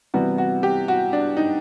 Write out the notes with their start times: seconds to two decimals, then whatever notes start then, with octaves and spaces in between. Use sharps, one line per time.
0.14 C3 E3 G3 B3 F#4
0.38 F#4
0.63 G4
0.88 F#4
1.13 D4
1.37 D#4